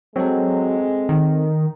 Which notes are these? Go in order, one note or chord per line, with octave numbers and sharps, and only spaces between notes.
F#3 G#3 C4 A4
D#3